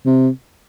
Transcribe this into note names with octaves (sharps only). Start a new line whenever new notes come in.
C3